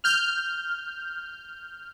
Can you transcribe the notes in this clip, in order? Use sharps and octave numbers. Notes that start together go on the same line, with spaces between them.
F6 G6